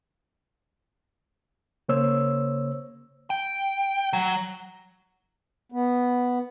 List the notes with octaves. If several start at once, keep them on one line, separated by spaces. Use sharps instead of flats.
C#3 A#3 C5 C#5 E6
G5
F#3
B3